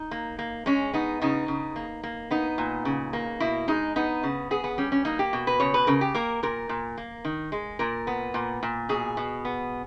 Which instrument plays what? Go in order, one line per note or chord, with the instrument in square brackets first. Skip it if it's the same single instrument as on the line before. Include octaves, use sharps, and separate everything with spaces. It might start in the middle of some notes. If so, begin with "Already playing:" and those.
Already playing: [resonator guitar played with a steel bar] D#4
A#3
A#3
G#3 C#4
B3 D#4
C#3 D#4
C#3
A#3
A#3
B3 D#4
A#2
C#3
A#3
B2 E4
G#3 D#4
B3 D#4
C#3
B3 G#4
B3
G3 C#4
C#4
A#3 D#4
G4
B2
B4
C#3 C#5
B4
C#3 A#4
G4
A#3 A#4
A#2 A#4
A#2
A#3
D#3
G#3
A#2 A#4
B3
A#2
A#2
B2 G#4
B2
B3